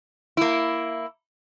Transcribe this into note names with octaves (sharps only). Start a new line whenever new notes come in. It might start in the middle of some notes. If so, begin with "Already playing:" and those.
A#3 E4